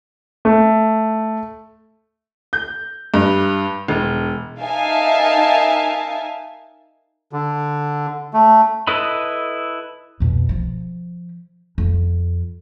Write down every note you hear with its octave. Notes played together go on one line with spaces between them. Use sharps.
A3
G6
G2
E1
D#4 A#4 E5 F5 G#5 A5
D3
A3
E4 A4 B4 D#5 B5
F2 B2
F3
F2